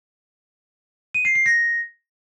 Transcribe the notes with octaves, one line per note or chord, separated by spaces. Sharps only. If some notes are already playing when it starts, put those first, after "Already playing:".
D#7
C7
C7
A#6